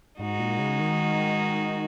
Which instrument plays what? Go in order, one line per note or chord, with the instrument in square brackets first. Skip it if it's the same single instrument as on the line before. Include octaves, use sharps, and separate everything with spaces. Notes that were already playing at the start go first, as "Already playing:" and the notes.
[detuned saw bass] G#2 [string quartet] G#3 D#4 F#4
[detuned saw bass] A#2
C#3
D#3